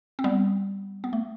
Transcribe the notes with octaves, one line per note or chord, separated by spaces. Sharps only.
C4
G3 B3
B3
A3